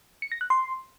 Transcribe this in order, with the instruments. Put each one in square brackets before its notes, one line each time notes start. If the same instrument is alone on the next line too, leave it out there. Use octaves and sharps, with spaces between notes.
[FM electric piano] C#7
A#6
F#6
C6